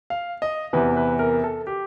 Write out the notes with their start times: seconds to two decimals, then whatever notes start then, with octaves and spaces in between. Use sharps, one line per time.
0.10 F5
0.42 D#5
0.73 E2 C3 E3 B4
0.97 B4
1.19 A#4
1.44 A4
1.67 G4